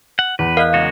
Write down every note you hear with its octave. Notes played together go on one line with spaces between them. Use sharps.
F#5
E2 B4
A#4 D#5 F5 F#6
C#3 G#3 F#4